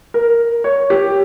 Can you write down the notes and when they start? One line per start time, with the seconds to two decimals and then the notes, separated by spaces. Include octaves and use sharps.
0.14 A#4
0.64 C#5
0.90 G4